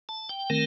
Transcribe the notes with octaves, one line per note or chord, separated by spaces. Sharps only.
A5
G5
D#3 A3 C4 A#4